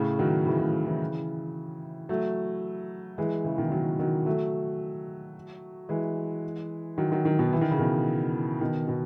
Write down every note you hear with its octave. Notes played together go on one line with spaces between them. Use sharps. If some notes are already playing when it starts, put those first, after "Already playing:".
Already playing: A2 C#3
D#3 F#3
C#3 E3
A2 C#3
C#3 E3
F#3 A3
E3 G#3
C#3 E3
B2 D#3
D#3 F#3
D#3 F#3
F#3 A3
E3 G#3
D#3 F#3
D#3 F#3
D#3 F#3
B2 D#3
E3
D#3
C#3
B2 D#3
B2 D#3
B2 D#3